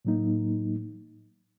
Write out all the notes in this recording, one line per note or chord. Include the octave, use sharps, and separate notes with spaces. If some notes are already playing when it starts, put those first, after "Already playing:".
A2 F#3 A#3 D#4